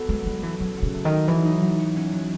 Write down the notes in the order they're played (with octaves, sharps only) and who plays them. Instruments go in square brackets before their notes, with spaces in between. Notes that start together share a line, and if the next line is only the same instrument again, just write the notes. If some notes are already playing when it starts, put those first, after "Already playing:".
Already playing: [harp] B3 F#4 A4
[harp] F#3 [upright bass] G#3
[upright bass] G#3 [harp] B3
[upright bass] E3 [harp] A4
[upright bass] C#3 [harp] F#3
[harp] F#4
[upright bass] C#3
[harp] A3
[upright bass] D#3
[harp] D#4
[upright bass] E3 [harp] F#3
[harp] D#4
F#3
F#4
C#4
F#3